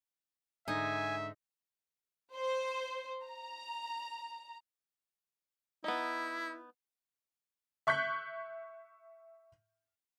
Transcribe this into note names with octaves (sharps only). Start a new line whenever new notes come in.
G#2 D3 D#4 E5 G#5
C5
A#5
B3 D#4 E4
E5 C#6 F#6 G6 B6